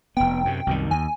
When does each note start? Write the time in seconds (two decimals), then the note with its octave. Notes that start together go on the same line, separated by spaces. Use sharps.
0.17 F1 B3 G5
0.45 F#2 C3
0.67 C2 F#2 D#3
0.91 D#2 G#5